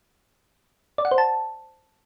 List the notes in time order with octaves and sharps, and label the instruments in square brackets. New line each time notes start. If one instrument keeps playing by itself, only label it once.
[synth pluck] D5
F#5
C5
A5